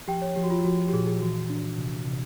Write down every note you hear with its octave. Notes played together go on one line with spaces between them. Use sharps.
F3 G4 G5
C#5
F3 G4
F#4
F4
F3 F#4
G4
A#2 G#4
G#4
E3 F#4
D4
C3
C3